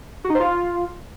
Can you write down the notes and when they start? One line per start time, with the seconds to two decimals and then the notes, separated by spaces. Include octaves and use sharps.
0.24 F#4
0.30 D#4
0.35 C5
0.40 F4